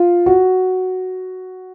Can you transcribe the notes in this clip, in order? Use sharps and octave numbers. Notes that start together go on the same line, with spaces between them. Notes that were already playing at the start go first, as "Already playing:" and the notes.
Already playing: F4
F#4